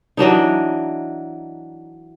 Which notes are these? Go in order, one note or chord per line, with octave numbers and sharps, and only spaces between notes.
E3 F#3 D4 D#4